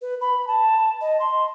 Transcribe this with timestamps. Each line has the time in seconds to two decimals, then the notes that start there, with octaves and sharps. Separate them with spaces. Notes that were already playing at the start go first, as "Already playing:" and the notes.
0.02 B4
0.21 B5
0.47 A5
1.01 D#5
1.20 C6